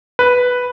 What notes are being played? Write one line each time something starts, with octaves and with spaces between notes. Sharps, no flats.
B4